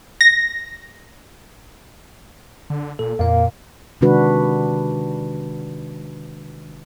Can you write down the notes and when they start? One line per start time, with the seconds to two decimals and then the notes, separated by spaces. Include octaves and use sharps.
0.21 A#6
2.70 D3
2.99 A#2 A4
3.19 F2 A#2 A#3 F5
4.01 C3 D#3 G#3 D4 F#4 B4